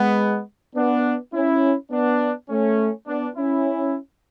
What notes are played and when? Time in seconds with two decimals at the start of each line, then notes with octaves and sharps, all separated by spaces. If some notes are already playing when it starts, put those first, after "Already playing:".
Already playing: G#3 B3
0.76 B3 D4
1.33 C#4 E4
1.91 B3 D4
2.49 A3 C#4
3.07 B3 D4
3.36 C#4 E4